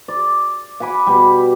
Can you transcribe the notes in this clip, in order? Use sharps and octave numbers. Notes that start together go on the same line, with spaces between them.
D5
F#5 G#5 B5 D6
B2 G3